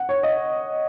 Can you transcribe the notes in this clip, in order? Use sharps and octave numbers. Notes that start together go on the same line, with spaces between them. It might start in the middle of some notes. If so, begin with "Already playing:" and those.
Already playing: F#5
C#5
D#5